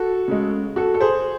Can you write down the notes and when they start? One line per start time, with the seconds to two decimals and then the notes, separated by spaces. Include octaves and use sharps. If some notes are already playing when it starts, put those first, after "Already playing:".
Already playing: F#4 A4
0.28 C#3 G#3
0.76 F#4 A4
0.94 A4
1.01 G#4 C5